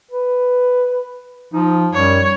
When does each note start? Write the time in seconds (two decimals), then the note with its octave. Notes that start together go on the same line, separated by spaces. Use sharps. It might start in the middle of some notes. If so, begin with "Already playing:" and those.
0.11 B4
1.53 F3 D#4
1.93 F#2 G3 C#5